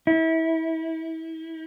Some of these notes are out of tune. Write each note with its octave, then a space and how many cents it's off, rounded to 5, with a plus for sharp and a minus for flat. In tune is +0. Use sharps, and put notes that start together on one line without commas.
E4 -30